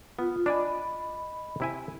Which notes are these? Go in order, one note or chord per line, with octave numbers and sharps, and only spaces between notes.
B3 F4
D4 D5 D#5 G#5 B5
C3 E4 G#5